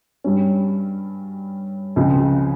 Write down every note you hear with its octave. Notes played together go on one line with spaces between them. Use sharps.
G2 G3 C#4
C#2 C#3 F3 C4